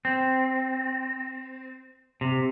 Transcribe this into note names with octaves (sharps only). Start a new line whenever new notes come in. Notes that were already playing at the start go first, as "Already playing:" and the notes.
C4
C3